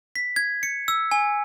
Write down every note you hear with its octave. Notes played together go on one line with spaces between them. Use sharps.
B6
G#6
C#7
E6
G#5